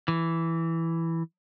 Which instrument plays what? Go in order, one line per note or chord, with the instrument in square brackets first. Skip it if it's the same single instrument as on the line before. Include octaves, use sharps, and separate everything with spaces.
[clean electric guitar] E3